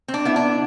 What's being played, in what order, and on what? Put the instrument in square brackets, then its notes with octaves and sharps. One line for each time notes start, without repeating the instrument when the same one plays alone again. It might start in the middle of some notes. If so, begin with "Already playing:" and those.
[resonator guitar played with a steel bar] C4
D4
B3 E4
D4